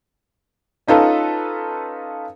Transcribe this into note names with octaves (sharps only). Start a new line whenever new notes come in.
C#4 D#4 F4 A4 B4